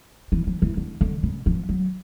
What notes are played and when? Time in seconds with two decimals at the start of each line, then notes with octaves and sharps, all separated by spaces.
0.32 E3
0.47 F3
0.62 E3
0.77 D3
1.01 D3
1.23 C#3
1.46 F3
1.69 F#3